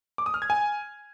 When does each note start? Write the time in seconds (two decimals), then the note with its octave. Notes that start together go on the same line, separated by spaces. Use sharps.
0.18 D6
0.26 D#6
0.34 F6
0.42 G#6
0.50 G#5